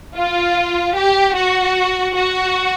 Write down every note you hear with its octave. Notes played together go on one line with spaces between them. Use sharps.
F4
G4
F#4
F#4